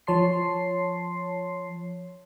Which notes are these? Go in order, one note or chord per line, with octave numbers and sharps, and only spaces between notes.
F3 C#5 A5 C6 C7